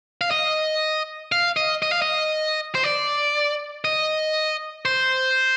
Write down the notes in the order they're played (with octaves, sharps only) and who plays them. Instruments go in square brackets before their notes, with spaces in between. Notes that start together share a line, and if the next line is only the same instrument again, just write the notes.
[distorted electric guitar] F5
D#5
F5
D#5
D#5
F5
D#5
C5
D5
D#5
C5